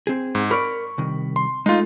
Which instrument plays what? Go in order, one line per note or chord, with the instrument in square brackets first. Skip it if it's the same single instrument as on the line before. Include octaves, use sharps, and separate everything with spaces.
[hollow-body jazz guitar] C4 G#4
[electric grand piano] G#2
[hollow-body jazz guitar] A#4 D5 [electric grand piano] B5 C#6
[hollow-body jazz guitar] C2 D#3
[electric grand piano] C6
[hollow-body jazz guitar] G#3 A3 [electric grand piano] D#4 F4